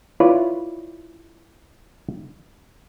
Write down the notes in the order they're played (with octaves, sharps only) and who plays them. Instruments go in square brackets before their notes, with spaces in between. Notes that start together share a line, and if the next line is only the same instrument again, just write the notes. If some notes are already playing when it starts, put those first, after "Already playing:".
[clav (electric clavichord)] E4 F4 B4 C#5 D5